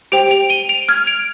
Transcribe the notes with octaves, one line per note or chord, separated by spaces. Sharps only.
G4 C5 G5 D7 F7
D7 F7
D#7 G7
D7 F7
F6 G#6
D7 F7